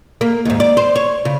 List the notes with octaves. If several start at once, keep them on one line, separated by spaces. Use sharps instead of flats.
A#3
D#2 G#2
D5
C5
C#5
C#3